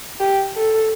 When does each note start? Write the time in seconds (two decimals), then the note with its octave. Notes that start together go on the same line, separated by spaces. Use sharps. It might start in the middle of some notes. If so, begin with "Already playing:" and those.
0.20 G4
0.57 A4